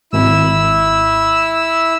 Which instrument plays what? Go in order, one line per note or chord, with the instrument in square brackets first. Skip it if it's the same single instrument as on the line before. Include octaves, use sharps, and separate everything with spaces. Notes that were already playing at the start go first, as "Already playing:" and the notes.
[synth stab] G#1 [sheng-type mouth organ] E4 E6